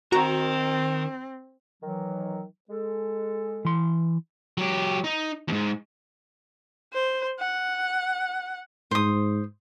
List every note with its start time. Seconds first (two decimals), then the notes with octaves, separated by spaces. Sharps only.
0.12 D#3 C4 F#4 A#4 A#5
1.83 D#3 E3 F#3
2.70 G#3 A4
3.65 E3 C6
4.58 F#3 G4
5.04 D#4
5.48 D#2 G#2
6.93 C5
7.40 F#5
8.91 G#2 C5 D#6